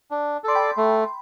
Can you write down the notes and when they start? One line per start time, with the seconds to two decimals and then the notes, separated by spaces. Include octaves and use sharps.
0.11 D4
0.44 A4 D5 C6
0.55 G5 B5
0.77 A3